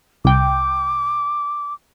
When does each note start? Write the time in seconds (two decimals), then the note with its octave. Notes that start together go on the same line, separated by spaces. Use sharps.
0.25 C2 G5 D6